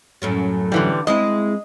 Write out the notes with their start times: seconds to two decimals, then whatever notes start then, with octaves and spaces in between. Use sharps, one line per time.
0.22 F#2 A2 F#3
0.72 D3 E3 G3
1.07 G#3 C4 E4 D#5